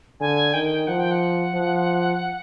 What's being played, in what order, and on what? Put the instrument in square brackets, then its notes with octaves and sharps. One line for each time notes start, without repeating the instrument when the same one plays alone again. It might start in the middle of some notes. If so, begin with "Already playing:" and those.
[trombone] D3 [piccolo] G#5
[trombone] D#3 [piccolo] G5
[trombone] F3 [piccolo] F#5
[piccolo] G5
F#5
[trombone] F3